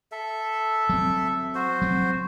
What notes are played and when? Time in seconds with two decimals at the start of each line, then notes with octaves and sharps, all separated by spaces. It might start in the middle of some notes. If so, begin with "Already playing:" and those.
0.12 A4 E5
0.89 F#3 C4
1.55 F#4 C5
1.82 F#3 C4